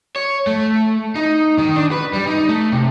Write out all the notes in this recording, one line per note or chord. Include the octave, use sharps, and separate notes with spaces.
C#5
A3
D#4
D#3
D4
B4
G3
D#4
A3
C3